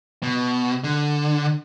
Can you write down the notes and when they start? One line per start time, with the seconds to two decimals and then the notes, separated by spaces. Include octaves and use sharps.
0.23 B2
0.84 D3